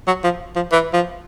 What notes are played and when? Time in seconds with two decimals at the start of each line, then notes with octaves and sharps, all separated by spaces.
0.07 F#3
0.24 F3
0.56 F3
0.72 E3
0.93 F3